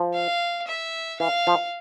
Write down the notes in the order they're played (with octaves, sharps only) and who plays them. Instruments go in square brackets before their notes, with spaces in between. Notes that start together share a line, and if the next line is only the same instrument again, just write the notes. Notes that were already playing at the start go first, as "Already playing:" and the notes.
Already playing: [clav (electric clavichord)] F3
[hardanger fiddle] F5
E5
[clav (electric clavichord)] E3 [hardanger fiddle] F5
[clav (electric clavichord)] F3